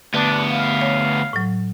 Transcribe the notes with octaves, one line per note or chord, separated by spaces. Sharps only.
D2 B3 D4
F5
C#5
A2 F#3